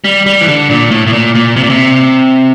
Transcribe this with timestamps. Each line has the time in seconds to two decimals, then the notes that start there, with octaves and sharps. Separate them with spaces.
0.04 G3
0.26 G3
0.40 E3
0.48 D3
0.70 A#2
0.91 A2
1.07 A2
1.13 A#2
1.35 A#2
1.56 C3
1.63 A#2
1.70 C3